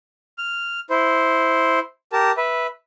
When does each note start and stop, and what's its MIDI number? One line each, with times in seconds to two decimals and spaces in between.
0.38 0.80 89
0.90 1.79 64
0.90 1.79 72
2.13 2.32 67
2.13 2.32 70
2.13 2.32 81
2.37 2.67 71
2.37 2.67 76